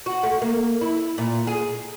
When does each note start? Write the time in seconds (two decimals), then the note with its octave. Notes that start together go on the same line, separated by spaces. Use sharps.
0.06 F#4
0.23 A3
0.42 A#3
0.81 E4
1.18 A#2
1.47 G#4